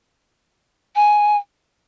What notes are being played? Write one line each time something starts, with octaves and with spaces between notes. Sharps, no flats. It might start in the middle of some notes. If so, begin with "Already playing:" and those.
G#5